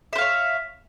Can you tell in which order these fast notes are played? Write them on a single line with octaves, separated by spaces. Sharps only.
E5 C5 F5 C#5